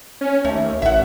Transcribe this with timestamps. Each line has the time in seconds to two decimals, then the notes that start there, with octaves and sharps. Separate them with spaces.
0.21 C#4
0.45 D#2 A3
0.82 A1 E5 F#5